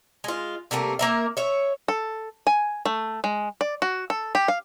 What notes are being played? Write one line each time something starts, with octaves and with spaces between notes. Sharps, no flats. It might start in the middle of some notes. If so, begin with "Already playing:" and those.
G#3 F4
C3 G3 A3 A#3
A#3 A#4 E5
C#5 E5
A4
G#5
A3
G#3
D5
F#4
A4
G4
F5